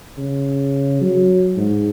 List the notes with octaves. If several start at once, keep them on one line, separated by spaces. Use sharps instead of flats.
C#3
F#3
G#2